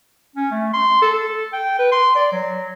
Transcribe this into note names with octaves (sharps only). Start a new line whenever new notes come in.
C#4
A3
C6
A4
A4
G5
B4
C6
D5
F#3